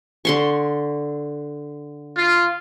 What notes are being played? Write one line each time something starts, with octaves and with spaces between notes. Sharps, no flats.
D3 C6 C#6
F4